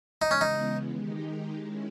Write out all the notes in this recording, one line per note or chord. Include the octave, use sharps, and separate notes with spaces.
C#3 E3 G#3 B3 D#4
C#4
D#4
D#3 G#3 D#4 G4
D#3 G#3 C#4 E4